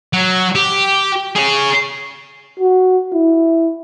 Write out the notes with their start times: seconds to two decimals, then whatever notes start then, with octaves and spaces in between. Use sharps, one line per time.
0.13 F#3
0.55 G4
1.36 G#4 C#5
2.60 F#4
3.13 E4